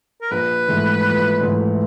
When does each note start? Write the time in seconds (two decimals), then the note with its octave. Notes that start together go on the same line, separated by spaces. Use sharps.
0.21 A#4
0.31 A#1 B4
0.68 G#2 E3 A3
1.04 A#1
1.41 G#2 E3 A3